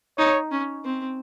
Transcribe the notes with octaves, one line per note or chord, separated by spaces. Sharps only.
D#4 C#5
C#4
C4